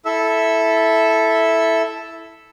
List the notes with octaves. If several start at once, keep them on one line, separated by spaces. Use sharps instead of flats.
E4 A4 E5 E6